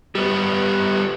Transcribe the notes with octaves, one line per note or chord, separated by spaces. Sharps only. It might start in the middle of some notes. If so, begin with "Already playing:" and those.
G3 B3 G4